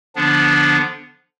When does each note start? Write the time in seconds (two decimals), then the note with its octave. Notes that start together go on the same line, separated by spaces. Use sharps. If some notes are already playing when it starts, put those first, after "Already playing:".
0.15 D3 F3 B3 D4